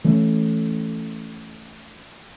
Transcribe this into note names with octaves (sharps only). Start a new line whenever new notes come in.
E3 A3 C#4